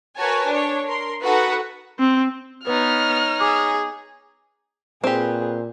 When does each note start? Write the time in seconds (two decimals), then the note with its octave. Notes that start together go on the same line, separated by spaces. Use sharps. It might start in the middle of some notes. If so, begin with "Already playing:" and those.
0.17 F#4 A#4 B4 C#5 G#5 A5
0.49 D4 C#5
0.85 A#4 C6
1.21 D#4 F#4 A4 B4 F#5 B5
1.99 C4
2.67 B3 D#4 B4 C#5 F6
3.40 G#4 D6 D#6
5.04 A#2 C4 G4 G#4 B4